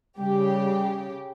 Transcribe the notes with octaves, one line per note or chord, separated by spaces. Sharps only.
C#3 G3 G4